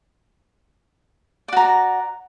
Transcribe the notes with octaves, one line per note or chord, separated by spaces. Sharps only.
F#4 D5 A#5